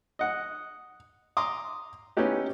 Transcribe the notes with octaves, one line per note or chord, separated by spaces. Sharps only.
D#5 F#5
A#5 C6 D6 D#6
B3 C#4 D#4 E4 G4 B4